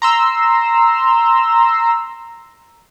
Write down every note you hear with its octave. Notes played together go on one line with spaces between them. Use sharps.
A#5 C6 E6